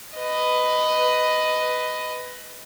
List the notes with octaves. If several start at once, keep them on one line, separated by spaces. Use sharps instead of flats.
B4 D#5